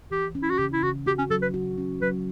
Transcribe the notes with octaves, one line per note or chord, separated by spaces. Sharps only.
E3 G4
C#4
E4
F#4
C#3 G4
E4
C#3 F#4
F#4 G4
C#4
F#3 A4
B4
F#4
C#4
F#3 B4